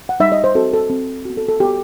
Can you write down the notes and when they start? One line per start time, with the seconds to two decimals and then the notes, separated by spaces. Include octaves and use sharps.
0.09 F#5
0.20 G3 D#4 G4 E5
0.32 D#5
0.44 C5
0.55 C4 F#4 A4
0.73 A4
0.90 C4 F#4
1.25 B3 F#4
1.37 A4
1.49 A4
1.60 B3 F#4 G4